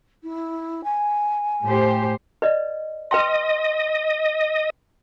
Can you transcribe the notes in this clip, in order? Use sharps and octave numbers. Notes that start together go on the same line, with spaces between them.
E4
G#5
A2 G4 C5
B4 D5 D#5
B4 D#5 G5 C6